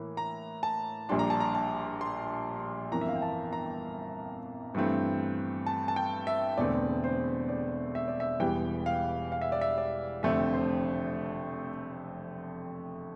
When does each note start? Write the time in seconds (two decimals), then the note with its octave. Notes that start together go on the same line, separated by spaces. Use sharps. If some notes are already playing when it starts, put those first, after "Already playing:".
Already playing: A2 E3 A#3
0.17 A#5
0.63 A5
1.09 A#1 A#2 G3 D4 C6
1.19 A#5
1.30 A5
1.40 A#5
1.55 A5
2.01 C6
2.92 G1 F2 E3 A#3 A#5
3.01 E5
3.08 F5
3.16 G5
3.22 A5
3.53 A#5
4.75 G2 E3 A3 C4
5.66 A5
5.88 A5
5.96 G5
6.27 E5
6.57 E1 E2 D3 A3 C4 D5
7.04 C5
7.49 D5
7.95 E5
8.08 D5
8.20 E5
8.40 E1 E2 E3 G3 G5
8.86 F5
9.32 F5
9.41 E5
9.52 D5
9.61 E5
9.78 D5
10.23 F1 F2 D3 A3 C4 E5
10.53 C5